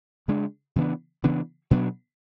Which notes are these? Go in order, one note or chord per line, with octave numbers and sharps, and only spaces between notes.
C#3 G#3 D4
C#3 E3 B3 D4
C#3 E3 B3 D4
B2 F#3 B3 D4